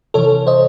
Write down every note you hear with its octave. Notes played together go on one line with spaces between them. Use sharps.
C3 E3 A4 C#5
C5 D#5